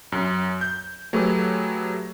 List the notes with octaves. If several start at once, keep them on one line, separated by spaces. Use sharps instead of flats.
F#2
G6
F#3 A3 G4 G#4 B4